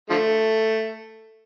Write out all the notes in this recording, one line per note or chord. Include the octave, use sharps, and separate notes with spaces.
D3 F3 A3